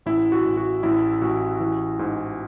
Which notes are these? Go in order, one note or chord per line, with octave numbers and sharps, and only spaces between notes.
A1 E4
F#4
A1
F#4
A1 E4
A1 F#4
E3
G#2